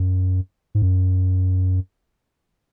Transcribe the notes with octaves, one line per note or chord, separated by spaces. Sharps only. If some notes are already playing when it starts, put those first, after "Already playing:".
Already playing: F#2
G#2
F#2